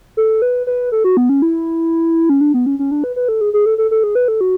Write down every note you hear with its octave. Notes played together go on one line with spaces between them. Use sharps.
A4
B4
B4
A4
F#4
B3
C#4
E4
C#4
D4
B3
C#4
C#4
D4
B4
B4
A4
G#4
G#4
A4
A4
A4
G#4
B4
A4
F#4